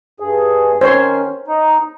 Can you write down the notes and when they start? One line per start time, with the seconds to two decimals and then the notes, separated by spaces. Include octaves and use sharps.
0.20 G2 G#4
0.81 D#3 C#4 C5 C#5 C6
1.48 D#4